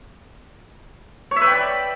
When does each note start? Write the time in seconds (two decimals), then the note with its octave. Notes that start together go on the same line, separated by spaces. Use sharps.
1.31 C#5
1.36 E5
1.41 B4
1.47 G5
1.52 D5